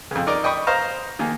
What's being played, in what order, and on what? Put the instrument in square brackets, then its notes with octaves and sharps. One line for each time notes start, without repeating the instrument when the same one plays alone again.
[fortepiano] F2 C#3
D#4 A#4 D5 D#5
D#5 G5 B5 C#6 D#6
C5 D#5 F5 A#5
D#3 A#3 G#4